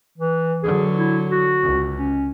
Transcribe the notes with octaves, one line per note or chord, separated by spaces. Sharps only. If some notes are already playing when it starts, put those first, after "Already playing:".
E3
D3 F#3 G#4
E4
F#4
C#2
C#4